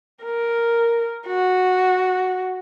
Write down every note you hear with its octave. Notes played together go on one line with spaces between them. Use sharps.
A#4
F#4